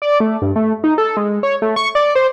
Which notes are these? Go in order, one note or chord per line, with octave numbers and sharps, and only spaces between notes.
D5
A3
G2
A3
D#4
A4
G#3
C#5
A3
C#6
D5
C5